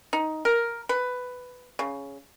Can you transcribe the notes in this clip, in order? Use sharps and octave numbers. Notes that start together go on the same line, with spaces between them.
D#4
A#4
B4
C#3